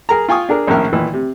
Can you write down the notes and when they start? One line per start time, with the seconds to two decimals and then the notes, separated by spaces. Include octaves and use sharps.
0.09 G#4 A#4 A#5
0.29 F4 G5 G#5 C#6 D#6
0.49 D4 G#4 A#4
0.67 A#1 A2 D#3 C#4 A#4 E5
0.93 A#2 D#3 E3
1.14 C3